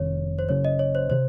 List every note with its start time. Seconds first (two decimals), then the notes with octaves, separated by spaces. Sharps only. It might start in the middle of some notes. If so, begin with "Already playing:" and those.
Already playing: F1 F2 D#3 C#5
0.39 C5
0.49 F#1 F#2 C#3 C#5
0.65 D#5
0.79 C#5
0.95 C5
1.10 C3 D#3 C5